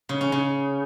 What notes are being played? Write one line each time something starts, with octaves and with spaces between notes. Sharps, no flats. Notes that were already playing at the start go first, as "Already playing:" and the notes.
C#3
C#4
C#3